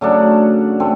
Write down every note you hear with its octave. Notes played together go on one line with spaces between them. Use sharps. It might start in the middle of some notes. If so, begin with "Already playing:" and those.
C#3 F#3 A3 D4
A3 C4